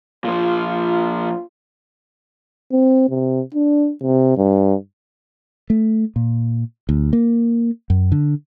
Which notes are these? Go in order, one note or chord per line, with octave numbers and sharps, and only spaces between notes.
A#2 F3 F4
C4
C3
D4
C3
G2
A3
A#2
D2
A#3
F#2
D3